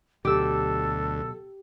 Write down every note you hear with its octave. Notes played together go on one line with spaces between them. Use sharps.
D2 B2 F#3 G4 A4 E6